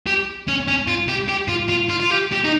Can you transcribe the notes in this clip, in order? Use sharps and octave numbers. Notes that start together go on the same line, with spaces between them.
G4
C#4
C#4
F4
G4
G4
F4
F4
F4
F4
G4
G4
D#4